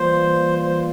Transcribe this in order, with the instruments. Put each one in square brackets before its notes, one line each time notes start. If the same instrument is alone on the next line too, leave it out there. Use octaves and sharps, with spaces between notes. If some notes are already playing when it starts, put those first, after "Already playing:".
Already playing: [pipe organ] E3 G3 A#3 F4 [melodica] C5
[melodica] C5